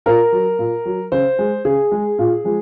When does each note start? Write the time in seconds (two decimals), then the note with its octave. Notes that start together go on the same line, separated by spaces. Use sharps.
0.06 A#2 A#4
0.32 F#3
0.59 A#2
0.85 F#3
1.12 C#3 C5
1.39 G#3
1.65 C#3 G#4
1.92 G#3
2.19 A#2
2.44 F3 G#3